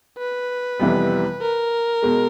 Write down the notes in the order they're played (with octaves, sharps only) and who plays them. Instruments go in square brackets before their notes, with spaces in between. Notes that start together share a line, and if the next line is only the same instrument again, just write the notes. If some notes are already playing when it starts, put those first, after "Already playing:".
[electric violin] B4
[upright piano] F2 C3 E3 G3 B3
[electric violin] A#4
[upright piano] B2 G#3